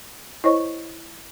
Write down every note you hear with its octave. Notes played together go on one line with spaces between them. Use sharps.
E4 C5 C#5 D#5 C#6